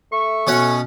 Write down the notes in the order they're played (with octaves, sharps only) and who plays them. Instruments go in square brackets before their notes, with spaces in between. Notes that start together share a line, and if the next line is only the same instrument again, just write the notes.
[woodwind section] A3 E5 C#6
[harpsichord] B2 C#4 F#5